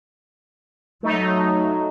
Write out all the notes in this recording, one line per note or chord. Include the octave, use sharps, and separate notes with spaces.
F#3 A3 D#4